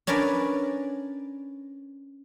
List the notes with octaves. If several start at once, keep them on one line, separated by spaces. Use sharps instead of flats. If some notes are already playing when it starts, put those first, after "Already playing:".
C#4 D4 A#4 B4 D5